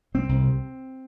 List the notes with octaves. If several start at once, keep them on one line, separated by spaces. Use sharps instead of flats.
C2 C4
C2
C3